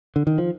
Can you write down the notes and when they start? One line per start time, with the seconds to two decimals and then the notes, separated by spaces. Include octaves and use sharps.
0.16 D3
0.27 D#3
0.38 F3